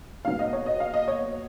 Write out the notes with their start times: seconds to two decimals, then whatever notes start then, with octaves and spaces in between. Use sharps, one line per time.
0.25 A#2 F#3 B3 F5
0.39 D#5
0.53 C#5
0.66 D#5
0.80 F5
0.94 D#5
1.08 C#5